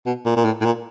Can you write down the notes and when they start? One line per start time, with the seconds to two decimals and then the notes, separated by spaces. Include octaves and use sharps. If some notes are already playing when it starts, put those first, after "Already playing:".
0.06 B2
0.25 A#2
0.36 A#2
0.45 A2
0.61 A2
0.65 A#2